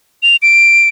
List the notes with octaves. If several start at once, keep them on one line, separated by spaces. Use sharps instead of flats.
F7
D7